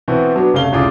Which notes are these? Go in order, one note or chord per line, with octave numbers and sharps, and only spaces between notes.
B2 E3 B3 C4
F#3 B3 D4
F1 C#3 A3 F5 G7
F1 C#2 A2 F4 G#4 D6